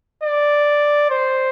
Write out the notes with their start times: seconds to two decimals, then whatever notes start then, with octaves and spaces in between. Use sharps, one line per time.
0.23 D5
1.10 C5